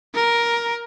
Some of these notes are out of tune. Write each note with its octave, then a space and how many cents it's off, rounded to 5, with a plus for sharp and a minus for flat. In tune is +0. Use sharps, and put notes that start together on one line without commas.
A#4 +10